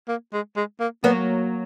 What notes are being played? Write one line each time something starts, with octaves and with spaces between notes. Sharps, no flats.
A#3
G#3
G#3
A#3
F#3 A#3 B3